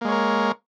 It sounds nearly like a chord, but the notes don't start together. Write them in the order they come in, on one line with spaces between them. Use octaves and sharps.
A#3 G#3 C#5 A#4